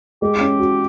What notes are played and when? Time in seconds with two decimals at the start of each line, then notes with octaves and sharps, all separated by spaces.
0.22 G#3 G4
0.41 C#4
0.60 F#4